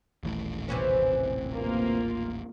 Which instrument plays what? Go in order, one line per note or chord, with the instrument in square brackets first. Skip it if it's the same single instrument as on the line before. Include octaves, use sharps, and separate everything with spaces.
[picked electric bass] D#1 A1 A2
[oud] C3 E3 C#4
[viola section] A#3 F4